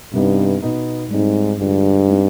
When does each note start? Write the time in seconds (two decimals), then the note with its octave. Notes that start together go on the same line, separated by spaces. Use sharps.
0.13 G2 C3 G3 B3 D#4
0.62 B2 B3 D#4
1.10 G#2 G3 C4 D#4
1.59 G2 D3 G#3 D4 F4
2.08 G3 C4 D#4